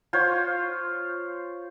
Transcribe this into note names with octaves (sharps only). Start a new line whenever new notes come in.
F4 C5 C#5